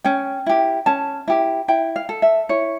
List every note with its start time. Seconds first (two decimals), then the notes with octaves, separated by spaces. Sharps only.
0.04 C#4 G5
0.46 E4 G4
0.86 C#4 A5
1.28 E4 G4
1.68 E4 G5
1.96 F5
2.09 A4
2.22 E5
2.49 E4 C#5